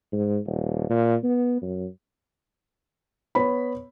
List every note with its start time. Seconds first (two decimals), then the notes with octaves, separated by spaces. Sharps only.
0.12 G#2
0.46 D#1
0.89 A#2
1.23 B3
1.62 F#2
3.35 B3 C#5 B5